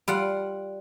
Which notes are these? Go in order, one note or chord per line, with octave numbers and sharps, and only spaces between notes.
G3 F4 F#5